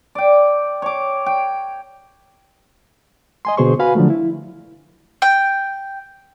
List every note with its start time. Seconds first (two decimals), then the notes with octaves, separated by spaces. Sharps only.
0.15 D5 G5
0.82 C#5 D6
1.26 G5
3.45 D#5 G#5 C6
3.57 B2 D3 G#4 C5 C6 C#6
3.79 F#4 B4 F5 G#5 B5
3.95 D3 F3 F#3 A3
4.10 E4
5.22 G5